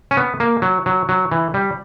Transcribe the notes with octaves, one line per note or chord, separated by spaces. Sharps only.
C#4
B3
A#3
F#3
F#3
F#3
E3
G3